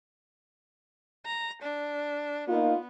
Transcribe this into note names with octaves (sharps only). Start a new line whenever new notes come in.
A#5
D4
A#3 B3 D#4 F4